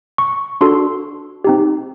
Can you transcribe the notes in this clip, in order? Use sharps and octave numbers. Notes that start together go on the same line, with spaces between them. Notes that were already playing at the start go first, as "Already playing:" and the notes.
C#6
D4 F#4 A4 C6
C4 D#4 G4